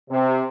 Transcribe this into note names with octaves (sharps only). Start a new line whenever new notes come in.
C3